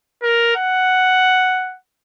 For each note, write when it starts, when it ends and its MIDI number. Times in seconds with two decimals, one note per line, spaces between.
0.23 0.55 70
0.56 1.76 78